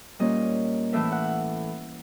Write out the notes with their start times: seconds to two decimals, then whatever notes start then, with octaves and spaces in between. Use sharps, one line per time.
0.19 A#2 G3 A#3 C#4 D#5
0.93 A2 E3 A3 E5
1.12 F#5